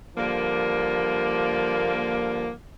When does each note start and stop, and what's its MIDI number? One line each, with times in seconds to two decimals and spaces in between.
0.17 2.51 50
0.17 2.51 53
0.17 2.51 55
0.17 2.51 58